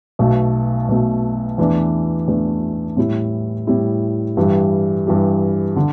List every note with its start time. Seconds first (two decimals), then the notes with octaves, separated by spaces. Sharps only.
0.19 B1 B2 A3
0.89 B1 B2 A3
1.58 E2 E3 A3 D4
2.28 E2 E3 A3 D4
2.97 A2 G3 E4
3.67 A2 G3 E4
4.37 G2 E3 G3
5.07 G2 E3 G3
5.76 D3